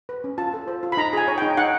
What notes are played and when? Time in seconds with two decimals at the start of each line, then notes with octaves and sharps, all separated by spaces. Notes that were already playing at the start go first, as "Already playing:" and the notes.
0.09 B4
0.24 C#4
0.38 F4 A5
0.54 A4
0.68 C5
0.83 F4
0.92 B5
0.97 D#4 A#5
1.13 G#4 G#5
1.28 C#5
1.38 D#4 G5
1.57 D#4 F#5